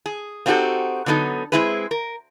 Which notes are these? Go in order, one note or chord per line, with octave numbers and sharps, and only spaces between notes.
G#4
A#3 C4 D#4 F#4 G4 A4
D3 F#3 B3 D#4 A4
G#3 C4 E4 G#4 B4
A#4